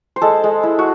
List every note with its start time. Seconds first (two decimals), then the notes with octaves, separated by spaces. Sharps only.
0.16 C5
0.21 G#3 A4
0.44 G#3
0.63 E4
0.79 F#4